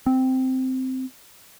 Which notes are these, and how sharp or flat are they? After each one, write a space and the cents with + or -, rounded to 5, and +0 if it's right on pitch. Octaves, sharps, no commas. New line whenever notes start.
C4 -10